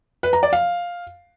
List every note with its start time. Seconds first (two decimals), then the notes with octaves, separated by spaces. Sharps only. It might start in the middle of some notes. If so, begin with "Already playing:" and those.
0.23 B4
0.33 A#5
0.43 D5
0.53 F5